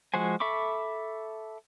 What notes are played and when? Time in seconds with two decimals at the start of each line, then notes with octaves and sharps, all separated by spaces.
0.14 F3 G#3 F#4 C5 G#5
0.40 A4 E5 B5 C#6 D6